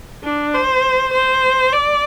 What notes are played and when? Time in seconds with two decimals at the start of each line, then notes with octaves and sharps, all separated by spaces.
0.24 D4
0.54 C5
1.13 C5
1.72 D5